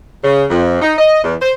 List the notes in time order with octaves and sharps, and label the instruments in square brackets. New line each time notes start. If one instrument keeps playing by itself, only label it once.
[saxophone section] C#3
F2
D#4
D#5
E2
C5